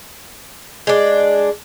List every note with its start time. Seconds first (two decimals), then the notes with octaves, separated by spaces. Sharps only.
0.87 G#3 D4